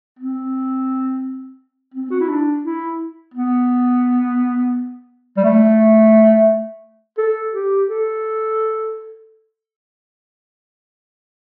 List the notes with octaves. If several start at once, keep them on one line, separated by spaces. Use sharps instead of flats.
C4
C4
F#4
E4
D4
E4
B3
G3
A3
A4
G4
A4